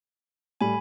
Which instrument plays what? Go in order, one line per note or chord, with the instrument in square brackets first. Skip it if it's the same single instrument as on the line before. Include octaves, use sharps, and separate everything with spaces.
[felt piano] A2 G3 [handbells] G#5 B5